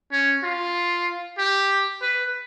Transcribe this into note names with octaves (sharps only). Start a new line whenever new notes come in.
C#4
F4
G4
B4